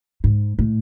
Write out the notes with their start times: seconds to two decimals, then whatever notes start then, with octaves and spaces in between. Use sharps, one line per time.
0.24 G#2
0.59 A2